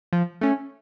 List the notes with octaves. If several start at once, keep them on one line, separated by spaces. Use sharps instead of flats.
F3
A3 C#4